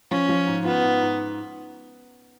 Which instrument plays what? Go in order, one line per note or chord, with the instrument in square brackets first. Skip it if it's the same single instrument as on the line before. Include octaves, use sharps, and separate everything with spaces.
[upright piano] F3 [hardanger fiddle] C#4
[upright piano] F3
G#2
[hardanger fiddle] B3 [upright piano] F4
[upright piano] G#2
G#2